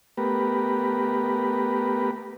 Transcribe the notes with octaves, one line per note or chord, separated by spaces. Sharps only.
A3 B3 G4 A#4 B4